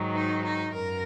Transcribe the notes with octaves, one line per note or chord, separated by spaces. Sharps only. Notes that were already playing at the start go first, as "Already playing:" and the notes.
Already playing: G#2 D#3 F#3
D#4
D#4
F#2 A#4